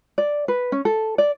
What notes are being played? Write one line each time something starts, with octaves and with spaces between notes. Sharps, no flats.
D5
B4
C#4
A4
D5